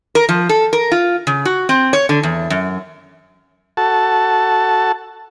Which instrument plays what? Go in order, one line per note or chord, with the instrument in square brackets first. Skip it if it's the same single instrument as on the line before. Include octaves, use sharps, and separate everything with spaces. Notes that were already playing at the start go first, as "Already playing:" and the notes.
[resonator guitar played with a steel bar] A#4
F3
A4
A#4
F4
C#3
F#4
C4
C#5
D3
E2
F#2
[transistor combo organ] F#4 A4 A5